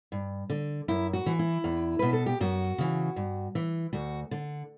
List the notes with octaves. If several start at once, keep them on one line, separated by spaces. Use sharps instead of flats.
G2
D3
F#2 E4
F#4
E3
E4
E2
B2 B4
A4
G4
F#2 F#4
C#3 E3
G2
E3
D2 F#4
D3